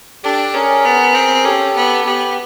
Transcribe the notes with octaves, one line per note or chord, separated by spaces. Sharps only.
D4 G4 A4
C#4 G#4 A#4
B3
C4
C#4 G4 A4
B3
B3 G4